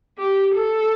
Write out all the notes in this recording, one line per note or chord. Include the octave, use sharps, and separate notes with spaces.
G4
A4